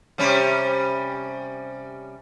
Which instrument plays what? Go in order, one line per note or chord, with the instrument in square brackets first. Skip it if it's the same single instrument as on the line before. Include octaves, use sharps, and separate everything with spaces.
[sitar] C3 G3 C#4